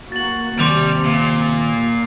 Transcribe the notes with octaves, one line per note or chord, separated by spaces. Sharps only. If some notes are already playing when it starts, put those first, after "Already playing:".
A#3 F#4 A6 F#7
D#2 C3 G3 C6 D6 F7
A#2